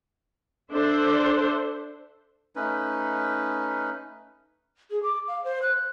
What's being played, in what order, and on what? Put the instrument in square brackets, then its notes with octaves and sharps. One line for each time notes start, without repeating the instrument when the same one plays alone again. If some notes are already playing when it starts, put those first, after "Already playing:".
[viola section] D4 A4 C5 E5
[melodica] A3 C#4 D#4 B4
[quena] G#4
D6
F5
C5
F#6